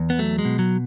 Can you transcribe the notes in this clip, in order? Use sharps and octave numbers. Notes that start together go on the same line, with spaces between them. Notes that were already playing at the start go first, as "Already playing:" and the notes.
Already playing: E2
B3
F#3 A3
G#3
B2
F#3